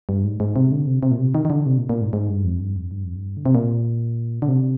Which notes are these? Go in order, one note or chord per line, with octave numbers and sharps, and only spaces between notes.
G2
G#2
G#2
C3
D3
C3
C3
A#2
C3
D#3
D#3
D3
C3
A#2
A#2
G#2
G#2
G2
F2
G2
F2
G2
F2
G2
D3
C3
A#2
D3
C3